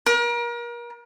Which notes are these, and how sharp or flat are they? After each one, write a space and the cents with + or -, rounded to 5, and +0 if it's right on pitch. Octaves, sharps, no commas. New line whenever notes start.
A#4 +35